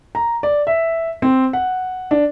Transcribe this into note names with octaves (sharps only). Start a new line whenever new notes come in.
A#5
D5
E5
C4
F#5
D4